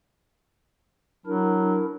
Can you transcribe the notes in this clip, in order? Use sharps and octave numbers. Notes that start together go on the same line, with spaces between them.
F#3 D4 E4 A#4